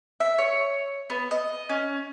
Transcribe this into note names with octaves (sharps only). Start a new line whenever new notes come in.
E5
C#5
B3
D#5
C#4